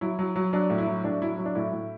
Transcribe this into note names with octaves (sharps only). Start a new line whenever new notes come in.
F#3 E4
F#3
F#3
F#3 D4
A2
E4
F#3
A2 D4
F#3 E4
F#3
D4
A2 E4
A2